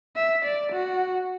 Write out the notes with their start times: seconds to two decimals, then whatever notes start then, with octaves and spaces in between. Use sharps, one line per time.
0.16 E5
0.45 D5
0.72 F#4